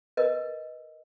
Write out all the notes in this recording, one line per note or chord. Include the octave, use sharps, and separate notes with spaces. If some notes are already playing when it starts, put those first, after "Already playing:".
A#4 B4 D#5